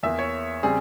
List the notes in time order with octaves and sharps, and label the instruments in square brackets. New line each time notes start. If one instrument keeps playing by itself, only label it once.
[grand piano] E2 E3 A#3 E5
C#5
C#3 G3 C4 G#4